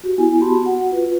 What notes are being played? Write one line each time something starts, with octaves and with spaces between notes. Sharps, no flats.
F#4 G4
B3 E4 G#5
B3 F#4 G4 A5 B5 C6
F#4 F#5
F4 B4